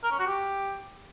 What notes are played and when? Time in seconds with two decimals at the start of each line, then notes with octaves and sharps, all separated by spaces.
0.03 A#4
0.11 C#4
0.19 F#4
0.27 G4